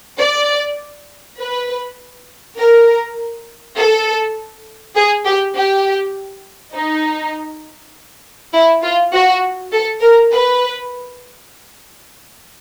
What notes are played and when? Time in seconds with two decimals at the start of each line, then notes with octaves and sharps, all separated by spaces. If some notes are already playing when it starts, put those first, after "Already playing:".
0.19 D5
1.39 B4
2.58 A#4
3.77 A4
4.96 G#4
5.25 G4
5.56 G4
6.74 D#4
8.54 E4
8.83 F4
9.13 F#4
9.73 A4
10.02 A#4
10.32 B4